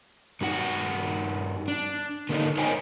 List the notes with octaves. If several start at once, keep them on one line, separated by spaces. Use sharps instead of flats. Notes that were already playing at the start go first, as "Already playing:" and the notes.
G2 D#4 F#4 F#5
D4
D3 A#3 C4 D4 D#4
A#4 C5 C#5 D#5 G5 G#5